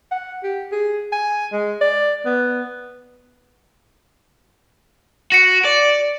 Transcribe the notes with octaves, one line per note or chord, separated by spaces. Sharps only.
F#5
G4
G#4
G#5
G#3
D5
B3
F#4 A#6 C#7
D5